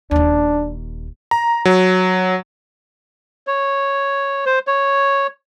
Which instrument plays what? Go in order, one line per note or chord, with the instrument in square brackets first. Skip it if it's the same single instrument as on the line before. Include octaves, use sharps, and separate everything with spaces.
[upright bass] D#1 D#2 [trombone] D4
[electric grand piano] A#5
F#3
[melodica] C#5
C5
C#5